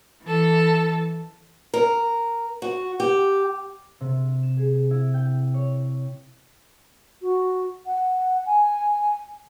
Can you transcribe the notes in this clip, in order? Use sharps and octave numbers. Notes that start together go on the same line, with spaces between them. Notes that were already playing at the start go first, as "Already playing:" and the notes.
E3 A4
A#4
F#4
G4
C3
E7
G#4
E4
G5
C#5
F#4
F#5
G#5